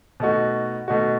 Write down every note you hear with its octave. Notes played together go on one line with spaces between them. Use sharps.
B2 A3 D#4 F#4
B2 A3 D#4 F#4